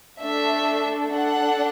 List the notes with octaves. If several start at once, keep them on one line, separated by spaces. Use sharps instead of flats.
A3 D4 A4 E5
D4 A4 F#5